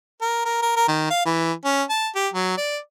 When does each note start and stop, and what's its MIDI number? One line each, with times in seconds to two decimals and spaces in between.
0.21 0.44 70
0.45 0.57 70
0.62 0.72 70
0.76 0.84 70
0.88 1.09 51
1.10 1.24 77
1.26 1.52 52
1.65 1.83 61
1.90 2.08 81
2.16 2.28 67
2.34 2.54 54
2.57 2.77 74